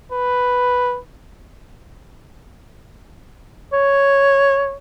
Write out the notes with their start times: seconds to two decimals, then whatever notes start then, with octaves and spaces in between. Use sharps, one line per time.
0.12 B4
3.73 C#5